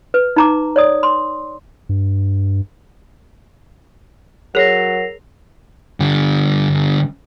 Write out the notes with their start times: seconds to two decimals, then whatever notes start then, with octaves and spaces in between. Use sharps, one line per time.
0.14 B4
0.36 D#4 A#5 D6
0.76 C#5 D5 D#6
1.03 C6
1.89 G2
4.55 F#3 G#4 A#4 C#5 A#6 C7 F7
6.00 D3 G3